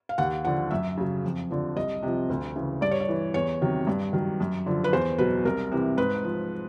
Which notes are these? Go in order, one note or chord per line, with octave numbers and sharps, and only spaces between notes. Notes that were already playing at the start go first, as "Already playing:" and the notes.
F5
D#2 F#5
D3 F3 F#5
F#2 E5
C#3 F#3
F2
D3 F3
C2 D#5
C3 F3
D2
C#3 E3
G2 D5
C#5
D5
E3
E2 C#5
C3 D#3 F#3
G2
D#3 F#3
F#2
D3 F3
B4
E2 C5
B2 F#3 B4
C2 A#4
C3 E3
G#2 B4
F3